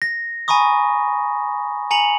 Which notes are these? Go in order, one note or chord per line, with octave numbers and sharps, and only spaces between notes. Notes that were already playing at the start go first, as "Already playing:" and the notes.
A#6
G#5 A#5 B5 C#6 D#6
G#5 A#5 C#7 F7 F#7